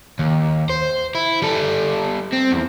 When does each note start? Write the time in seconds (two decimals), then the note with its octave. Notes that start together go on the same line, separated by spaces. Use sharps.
0.19 D#2
0.70 C5
1.15 E4
1.42 G3 A4
2.32 C4
2.52 E2